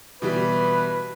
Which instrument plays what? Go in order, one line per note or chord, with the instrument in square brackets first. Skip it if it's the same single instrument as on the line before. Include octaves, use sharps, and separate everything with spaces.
[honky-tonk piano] B2 E3 G3 [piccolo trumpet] B4